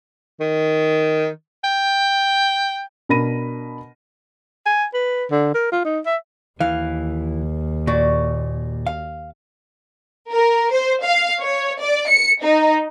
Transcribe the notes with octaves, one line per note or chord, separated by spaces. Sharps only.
D#3
G5
B2 D4 A#4 B5 A#6 D#7
G#5
B4
D3
A#4
F4
D#4
E5
D#2 E3 F5
A#2 F#4 D5
F5
A#4
C5
F5
C#5
D5
C#7
D#4